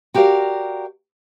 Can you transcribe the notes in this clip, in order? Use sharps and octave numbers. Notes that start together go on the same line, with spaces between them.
F#4 G4 A#4 D5 F5